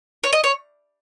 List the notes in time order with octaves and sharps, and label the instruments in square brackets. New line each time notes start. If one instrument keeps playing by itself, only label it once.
[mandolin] C#5
D#5
C#5